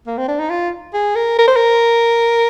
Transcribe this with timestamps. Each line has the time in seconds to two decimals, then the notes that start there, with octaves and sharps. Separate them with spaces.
0.07 A#3
0.18 C4
0.28 D4
0.39 D#4
0.50 F4
0.94 G#4
1.15 A#4
1.38 A#4
1.48 C5
1.56 A#4